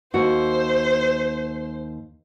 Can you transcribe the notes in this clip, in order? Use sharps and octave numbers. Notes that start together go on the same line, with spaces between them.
D#2 F#4 C5